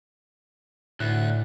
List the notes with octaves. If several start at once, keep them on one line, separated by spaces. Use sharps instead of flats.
D2 A2 F#6